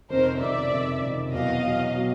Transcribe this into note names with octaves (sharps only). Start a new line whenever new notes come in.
F2 C3 D#3 A#4 C5
F2 C3 D#3 D5 E5
F2 C3 D#3
F2 C3 D#3
E2 B2 F#3 B3 D#5 F5
E2 B2 F#3 B3
B2 F#3 B3